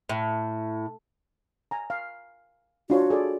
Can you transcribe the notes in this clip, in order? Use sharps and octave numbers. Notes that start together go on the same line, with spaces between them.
A2
G#5 A#5
F5
D4 F4 F#4 C#5
G#4 A4 D5